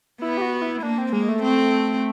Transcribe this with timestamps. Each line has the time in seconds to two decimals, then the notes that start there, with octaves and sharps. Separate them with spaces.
0.21 B3 E4
0.37 G4
0.42 F#4
0.62 E4
0.82 A#3 D4
0.98 C4
1.13 G#3 A#3
1.29 A3
1.43 C4